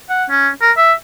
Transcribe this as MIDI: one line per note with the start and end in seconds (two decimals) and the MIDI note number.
0.10 0.25 78
0.30 0.49 61
0.62 0.72 70
0.77 0.93 76